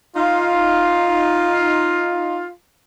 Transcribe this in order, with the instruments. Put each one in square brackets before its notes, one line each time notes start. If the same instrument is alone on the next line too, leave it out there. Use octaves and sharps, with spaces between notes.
[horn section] D#4 F4